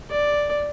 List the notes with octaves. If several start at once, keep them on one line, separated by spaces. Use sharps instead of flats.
D5